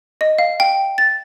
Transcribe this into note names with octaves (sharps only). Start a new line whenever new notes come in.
D#5
F5
G5
A6